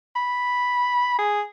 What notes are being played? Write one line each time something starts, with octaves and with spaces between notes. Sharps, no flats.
B5
G#4